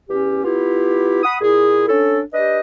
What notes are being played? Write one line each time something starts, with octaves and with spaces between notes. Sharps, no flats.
E2 C#4 G4
B3 E4 F4 G4
F#5 B5 D#6
A#2 E4 G#4
C#4 D4 A4
D4 G4 B4 D#5